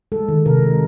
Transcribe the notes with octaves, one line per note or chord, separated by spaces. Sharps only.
G#3 A4
D#3
C3 A#4
G#3